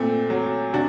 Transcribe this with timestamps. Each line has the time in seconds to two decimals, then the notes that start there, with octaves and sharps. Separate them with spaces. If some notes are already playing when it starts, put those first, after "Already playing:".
Already playing: A#2 A3 C4
0.30 F#3
0.73 C3 D4 F#4